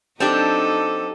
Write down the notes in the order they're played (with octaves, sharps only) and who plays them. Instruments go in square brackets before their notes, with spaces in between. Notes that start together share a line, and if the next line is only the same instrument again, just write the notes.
[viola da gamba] F#3 D#4 A4 [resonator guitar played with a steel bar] C4 D4 G4